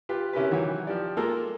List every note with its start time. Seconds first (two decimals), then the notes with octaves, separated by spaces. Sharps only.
0.09 F4 G4 B4
0.33 C3 C#4 E4 G4 A#4 B4
0.50 D#3 E3 F#3
0.87 F3 G4 D5
1.17 G#3 A#3 F4 A4 A#4